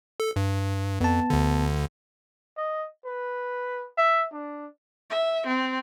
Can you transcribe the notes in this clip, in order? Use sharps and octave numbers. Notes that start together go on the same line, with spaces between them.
A4
G2
F2 B3 A5
D2 D3
D#5
B4
E5
D4
E5
C4